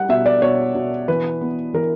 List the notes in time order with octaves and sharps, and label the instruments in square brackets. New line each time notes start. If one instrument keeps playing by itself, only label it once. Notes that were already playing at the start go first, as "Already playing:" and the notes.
Already playing: [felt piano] G3 F#5
B2 E5
D5
B2 C#5
B2
E3 B4
B3
E3 A#4